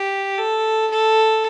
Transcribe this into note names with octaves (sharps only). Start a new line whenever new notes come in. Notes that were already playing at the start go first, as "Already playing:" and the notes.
Already playing: G4
A4
A4